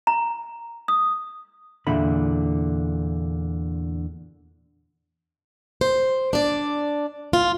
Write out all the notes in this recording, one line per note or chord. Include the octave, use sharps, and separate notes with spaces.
A#5
D#6
E2 A#2 D3 B5
C5
D4 D5
F4